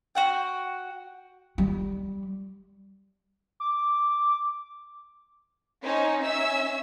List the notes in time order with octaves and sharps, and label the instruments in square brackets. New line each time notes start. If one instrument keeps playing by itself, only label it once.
[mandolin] F#4 F#5 G5
[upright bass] G3
[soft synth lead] D6
[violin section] C#4 D#4 C5 C#5
C#4 E5 E6